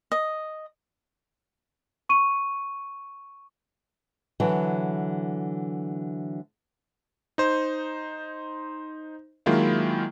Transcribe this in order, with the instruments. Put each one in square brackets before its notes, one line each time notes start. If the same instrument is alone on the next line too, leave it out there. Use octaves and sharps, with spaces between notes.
[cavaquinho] D#5
[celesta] C#6 D#7
[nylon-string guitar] D3 E3 F#3
[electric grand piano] D#4 C5
D#3 F#3 G#3 A#3 E4 F4